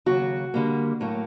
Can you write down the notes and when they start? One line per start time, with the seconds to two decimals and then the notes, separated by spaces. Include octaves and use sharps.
0.06 D#2 C#3 F#3 F#4
0.54 D3 G3 A#3
1.00 A2 F#3 A#3